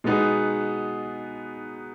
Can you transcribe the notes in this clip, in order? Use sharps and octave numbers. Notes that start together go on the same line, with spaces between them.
B2 G#3 B3 D#4 G#4